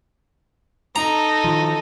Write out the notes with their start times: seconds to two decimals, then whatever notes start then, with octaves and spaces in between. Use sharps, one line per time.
0.96 D#4 A4 A#5
1.44 D#3 F3